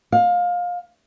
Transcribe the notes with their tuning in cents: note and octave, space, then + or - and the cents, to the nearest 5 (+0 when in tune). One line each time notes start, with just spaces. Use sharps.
F5 +25